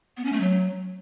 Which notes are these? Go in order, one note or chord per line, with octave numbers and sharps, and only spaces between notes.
B3
C#4
A3
F#3